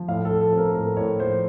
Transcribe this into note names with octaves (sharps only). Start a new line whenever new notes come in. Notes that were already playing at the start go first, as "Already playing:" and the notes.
Already playing: F3
A2 F5
A4
F3
A4
C4
A#4
A2 A#4
A2 C#5
F3 C5